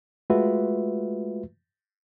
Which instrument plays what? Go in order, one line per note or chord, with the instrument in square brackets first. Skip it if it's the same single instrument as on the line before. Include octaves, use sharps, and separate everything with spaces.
[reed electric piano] G#3 A3 F4 F#4 B4 E5